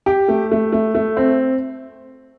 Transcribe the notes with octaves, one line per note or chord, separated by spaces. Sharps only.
G4
A3
A3
A3
A3
C4